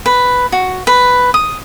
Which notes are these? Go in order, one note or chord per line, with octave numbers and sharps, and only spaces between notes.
B4
F#4
B4
D#6